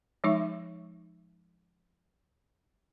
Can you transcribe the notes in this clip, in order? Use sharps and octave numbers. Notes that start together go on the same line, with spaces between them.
F3 G#3 D#4 E5 C#6